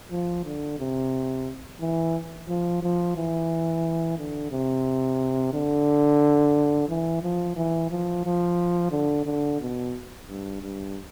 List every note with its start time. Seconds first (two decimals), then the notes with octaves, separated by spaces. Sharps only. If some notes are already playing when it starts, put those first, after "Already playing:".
0.11 F3
0.45 D3
0.79 C3
1.81 E3
2.48 F3
2.83 F3
3.16 E3
4.18 D3
4.51 C3
5.53 D3
6.89 E3
7.23 F3
7.56 E3
7.90 F3
8.25 F3
8.92 D3
9.26 D3
9.60 B2
10.28 G2
10.62 G2